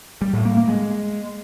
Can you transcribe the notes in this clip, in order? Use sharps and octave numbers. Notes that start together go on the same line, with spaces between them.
G3
A2
A#3
A#3
G#3